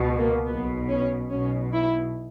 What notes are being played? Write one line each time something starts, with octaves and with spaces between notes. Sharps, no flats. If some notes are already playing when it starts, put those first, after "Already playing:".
Already playing: C#2 B2
A#3
B1 B2 B3
C#4
B1 B2 C#4
E4